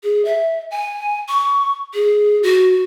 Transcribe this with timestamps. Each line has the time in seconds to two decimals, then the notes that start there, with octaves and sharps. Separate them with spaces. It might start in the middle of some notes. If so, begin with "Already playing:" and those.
0.03 G#4
0.25 E5
0.71 G#5
1.28 C#6
1.94 G#4
2.43 F#4